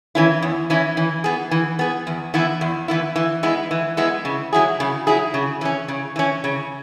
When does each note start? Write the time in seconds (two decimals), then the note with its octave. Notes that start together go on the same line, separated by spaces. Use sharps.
0.15 E3 C#4 E4
0.42 E2
0.70 E3 C#4 E4
0.97 E3
1.24 B3 G#4
1.51 E3
1.79 B3 G#4
2.07 E2
2.34 E3 B3 E4
2.61 E2
2.88 E3 B3 E4
3.16 E3
3.43 G#3 B3 E4
3.71 E3
3.97 G#3 B3 E4
4.25 C#3
4.53 F#3 E4 G#4
4.80 C#3
5.07 F#3 E4 G#4
5.34 C#3
5.61 E3 C#4
5.88 C#3
6.16 E3 C#4
6.44 C#3